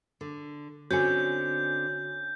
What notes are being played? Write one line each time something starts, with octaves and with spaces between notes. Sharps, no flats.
D3
D3 C4 C#4 F#4 G#5 G6